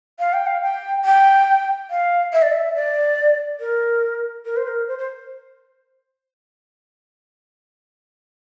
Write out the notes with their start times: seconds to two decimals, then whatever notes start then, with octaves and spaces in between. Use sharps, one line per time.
0.19 F5
0.33 G5
0.47 F5
0.62 G5
1.05 G5
1.90 F5
2.33 E5
2.42 D5
2.52 E5
2.76 D5
3.60 A#4
4.45 A#4
4.57 C5
4.68 A#4
4.88 C5
4.99 C5